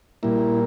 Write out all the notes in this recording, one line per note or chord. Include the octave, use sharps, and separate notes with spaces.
A#2 G3 A#3 E4